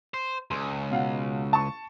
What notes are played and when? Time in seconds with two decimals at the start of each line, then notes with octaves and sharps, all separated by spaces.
0.14 C5
0.51 C#2 C6
0.91 B2 F5 F#5
1.53 A5 C#6